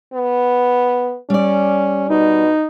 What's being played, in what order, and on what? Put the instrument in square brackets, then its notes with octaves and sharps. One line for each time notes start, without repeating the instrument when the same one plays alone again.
[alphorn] B3
[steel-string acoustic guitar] G3 D5 [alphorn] C#4
[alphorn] B2 [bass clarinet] D#4